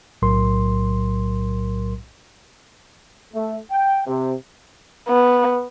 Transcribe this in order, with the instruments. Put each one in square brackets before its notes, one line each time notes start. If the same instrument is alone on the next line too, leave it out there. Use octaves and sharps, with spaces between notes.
[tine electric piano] B1 A2 F#3 A#4 C6
[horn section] A3
G5
C3
[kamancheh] B3